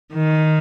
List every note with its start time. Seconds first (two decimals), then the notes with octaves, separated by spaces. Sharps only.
0.14 D#3